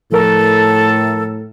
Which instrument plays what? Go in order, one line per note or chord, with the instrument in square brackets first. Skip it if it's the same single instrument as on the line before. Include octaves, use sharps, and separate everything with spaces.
[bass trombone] A2 [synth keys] F3 A#4 [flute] A4